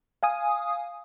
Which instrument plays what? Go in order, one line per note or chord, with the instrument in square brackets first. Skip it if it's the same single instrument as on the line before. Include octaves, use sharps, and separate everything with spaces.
[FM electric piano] F5 G#5 D#6